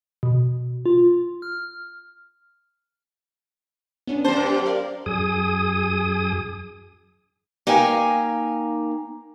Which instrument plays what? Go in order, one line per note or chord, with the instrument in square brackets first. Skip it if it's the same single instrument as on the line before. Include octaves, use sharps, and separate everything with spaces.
[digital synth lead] B2
F4
F6
[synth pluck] B3 C#4 D4
[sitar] F#2 C5 [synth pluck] A5
[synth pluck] G4
A#4 D5 F5
[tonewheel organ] F#2 G#4 D#6
[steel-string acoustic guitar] A#3 D#4 F5 G5 G#5